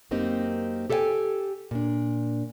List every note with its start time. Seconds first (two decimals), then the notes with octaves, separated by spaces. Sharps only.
0.11 F#2 A#3 C4 D#4 G4
0.90 G4 A4 C5 E5 G5 G#5
1.71 A#2 D4